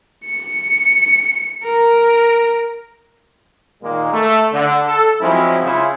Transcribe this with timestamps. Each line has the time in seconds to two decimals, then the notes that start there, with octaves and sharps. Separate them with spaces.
0.25 C#7
1.63 A#4
3.83 A#2 D#3 G#3 A#3
4.13 A3
4.52 D3
4.87 A4
5.21 F3 F#3 G#3 C4 C#4 E4
5.62 C#3 E4 F4